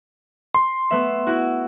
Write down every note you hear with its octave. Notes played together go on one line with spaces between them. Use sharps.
C6
A3 B3 E5
E4 F#4